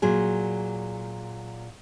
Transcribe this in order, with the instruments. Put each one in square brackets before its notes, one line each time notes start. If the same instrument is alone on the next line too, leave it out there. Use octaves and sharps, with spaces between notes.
[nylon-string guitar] A#2 F#3 G#4